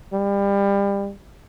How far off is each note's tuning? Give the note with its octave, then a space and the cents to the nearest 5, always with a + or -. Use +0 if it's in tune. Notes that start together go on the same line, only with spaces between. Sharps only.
G3 +30